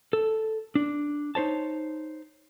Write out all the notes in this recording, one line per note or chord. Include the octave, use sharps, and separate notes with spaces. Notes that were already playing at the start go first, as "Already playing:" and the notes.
A4
D4
D#4 C5 C#5 A5